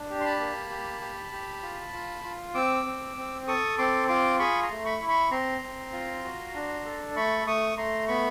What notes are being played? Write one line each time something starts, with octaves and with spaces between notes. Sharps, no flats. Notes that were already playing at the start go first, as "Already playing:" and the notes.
Already playing: D4
G4
C6
A5 B5
A#3
G4
G4
G4
F4
F4
F4
C4 D6 E6
C4
C4
A4 C#6 D#6
C4 C6 D6
F4 C6 D6
G#4 B5 C#6
A#5 C6
A3
B5 C#6
E4
B5 C#6
C4 A#5 C6
C4
F4
F#4
D4
A4
A3 B5 C#6
A3 C#6 D#6
A3 A#5 C6
B3 B5 C#6